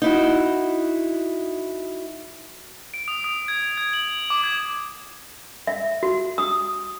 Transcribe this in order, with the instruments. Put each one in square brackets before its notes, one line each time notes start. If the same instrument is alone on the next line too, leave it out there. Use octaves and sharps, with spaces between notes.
[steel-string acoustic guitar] D#4 E4 F#4
[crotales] D7
D#6
D#6
G#6
G#6
F#7
D6
G#6
[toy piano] E5
F#4
D#6